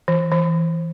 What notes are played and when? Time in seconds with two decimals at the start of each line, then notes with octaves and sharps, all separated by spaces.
0.08 E3
0.32 E3